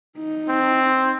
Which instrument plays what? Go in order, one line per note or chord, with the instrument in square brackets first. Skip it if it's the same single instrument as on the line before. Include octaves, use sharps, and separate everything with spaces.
[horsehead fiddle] D#4
[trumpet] C4